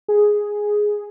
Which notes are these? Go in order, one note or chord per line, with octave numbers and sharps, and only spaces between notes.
G#4